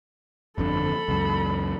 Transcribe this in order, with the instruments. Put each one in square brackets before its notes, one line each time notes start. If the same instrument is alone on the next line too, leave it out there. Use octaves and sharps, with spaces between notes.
[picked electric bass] G1 F2 D3 [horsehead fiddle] A4 B5
[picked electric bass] C#2 F#2